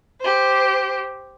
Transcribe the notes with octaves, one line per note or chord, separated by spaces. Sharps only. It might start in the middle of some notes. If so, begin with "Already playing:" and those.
G4 C5